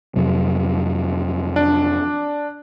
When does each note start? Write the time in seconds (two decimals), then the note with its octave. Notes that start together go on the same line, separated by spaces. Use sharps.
0.16 F2 C3 F#3
1.56 D4 D5